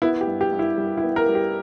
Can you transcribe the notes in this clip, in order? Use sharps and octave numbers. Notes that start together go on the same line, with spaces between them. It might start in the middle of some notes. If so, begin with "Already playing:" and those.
B3 E4
G4
G2
G4
G2
E4
G3
E4
B3
A#4
G3
G4